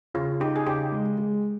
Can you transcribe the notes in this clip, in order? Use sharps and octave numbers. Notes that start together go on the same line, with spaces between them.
C#3 F4
D#4 G4
G#4
C#3 G4
G#3
G#3